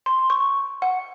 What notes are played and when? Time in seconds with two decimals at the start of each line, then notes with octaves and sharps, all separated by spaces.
0.06 C6
0.30 C#6
0.82 F#5